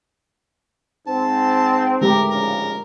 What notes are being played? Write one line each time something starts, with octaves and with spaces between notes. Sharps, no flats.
G#2 C4 A5
G#3 A3 G4 A#4
A#1 G#2 C#3 A#4